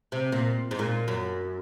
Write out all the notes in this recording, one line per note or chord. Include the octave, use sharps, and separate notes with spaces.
C3
A#2
G#2
A#2
F#2